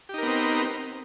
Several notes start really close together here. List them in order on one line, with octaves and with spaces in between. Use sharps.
G4 D#4 A#4 B3 C4